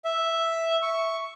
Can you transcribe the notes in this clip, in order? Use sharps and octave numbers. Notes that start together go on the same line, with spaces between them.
E5
C#6